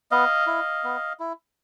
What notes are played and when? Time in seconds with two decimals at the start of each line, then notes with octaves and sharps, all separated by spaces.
0.11 B3 D#5 F5
0.47 E4
0.84 B3
1.20 E4